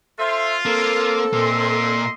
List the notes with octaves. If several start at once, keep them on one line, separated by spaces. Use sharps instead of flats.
F4 A4 C5 E5
A#3 C4 A4
A#2 A#3 D#5 E5 C6